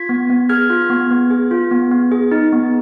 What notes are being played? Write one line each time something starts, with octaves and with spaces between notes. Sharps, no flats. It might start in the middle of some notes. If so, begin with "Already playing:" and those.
Already playing: F4 G#6 B6
B3
B3
G#4 F6 G#6
F4
B3
B3
G#4
F4
B3
B3
G#4
D#4
B3